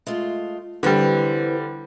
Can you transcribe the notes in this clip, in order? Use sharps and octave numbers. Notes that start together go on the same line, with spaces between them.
G#3 A3 F4
D3 E3 G3 C4